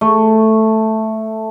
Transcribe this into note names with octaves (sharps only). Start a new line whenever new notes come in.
A3